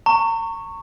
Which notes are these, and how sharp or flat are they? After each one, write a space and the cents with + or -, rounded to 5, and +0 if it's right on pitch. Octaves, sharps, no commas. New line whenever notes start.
A#5 -40 C#6 -5